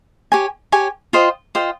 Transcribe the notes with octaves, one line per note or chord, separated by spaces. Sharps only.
G4 C#5 G#5
G4 C#5 G#5
F4 C5 D#5 G5
F4 C5 D#5 G5